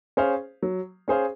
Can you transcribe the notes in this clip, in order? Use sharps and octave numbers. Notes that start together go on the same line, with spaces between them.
C#4 G#4 C5 F5
F#3
C#4 G#4 C5 F5